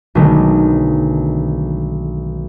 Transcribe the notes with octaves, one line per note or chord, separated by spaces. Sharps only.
B1 D3 D#3 G#3 A3